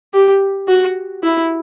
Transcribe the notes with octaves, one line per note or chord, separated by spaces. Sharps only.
G4
F#4
E4